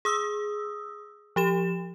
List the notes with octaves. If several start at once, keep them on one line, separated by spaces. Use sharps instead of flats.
G#4 D#6 E6
F3 G4 E7